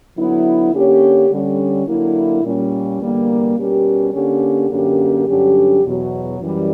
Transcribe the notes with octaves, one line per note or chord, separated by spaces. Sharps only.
D3 F#3 B3 E4
D3 A#3 C#4 G4 C#5
D3 G3 C#4
D3 F#3 A#3 E4
A#2 G3 C#4
E2 D3 G3 A#3
B2 G3 C#4 G4 A#4
D3 A#3 C#4 G4
F#2 D3 A#3 C#4 G4
G2 D3 F#3 C#4 G4
E2 B2 F#3
F#2 E3 G3